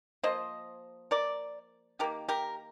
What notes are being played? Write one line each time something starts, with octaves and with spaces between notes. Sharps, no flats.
F3 A#3 C5 D#5
A#4 D5
D#3 A#3 G4 A#4
G4 A#4